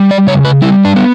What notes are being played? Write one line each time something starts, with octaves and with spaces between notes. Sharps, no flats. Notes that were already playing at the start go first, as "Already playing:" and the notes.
Already playing: G3
D5
C#3 C#5
B4
G3 E4
D4
B3